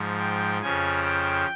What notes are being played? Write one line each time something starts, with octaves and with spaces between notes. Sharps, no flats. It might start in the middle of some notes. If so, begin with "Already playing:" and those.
Already playing: G#2 F3
G5
F2 C#3 F3 G#5
G5